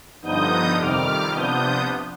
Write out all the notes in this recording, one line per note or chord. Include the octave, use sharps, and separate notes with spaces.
G2 D3 F3 B3 D#4 D#6 G6
F2 C3 D#3 G3 D6 F6
C3 F3 B3 D4 D#6 G6